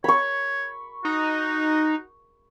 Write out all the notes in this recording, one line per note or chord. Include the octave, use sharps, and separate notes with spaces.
C#5 B5 C#6
D#4 F#4